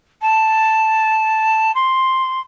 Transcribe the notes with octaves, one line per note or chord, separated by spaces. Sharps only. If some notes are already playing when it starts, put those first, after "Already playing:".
A5
C6